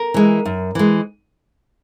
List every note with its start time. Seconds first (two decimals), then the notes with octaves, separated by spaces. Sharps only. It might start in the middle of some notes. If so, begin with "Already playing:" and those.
Already playing: A#4
0.14 E3 G#3
0.45 F#2
0.75 E3 G#3